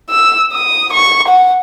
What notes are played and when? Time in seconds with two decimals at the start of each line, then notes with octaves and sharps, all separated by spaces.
0.10 E6
0.53 D#6
0.93 C#6
1.27 F#5